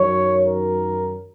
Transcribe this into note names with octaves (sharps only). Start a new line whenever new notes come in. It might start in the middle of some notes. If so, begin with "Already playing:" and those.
Already playing: F#2 D#3 F#3 C#5
A#4